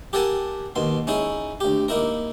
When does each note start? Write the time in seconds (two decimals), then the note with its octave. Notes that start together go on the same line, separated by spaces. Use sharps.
0.13 G4 A4 A#4 F#5 G#5 A5
0.76 D#2 B2 C6
1.07 C#4 D#4 E4 G#4
1.61 D2 G4
1.88 A#3 D#4 E4 A#4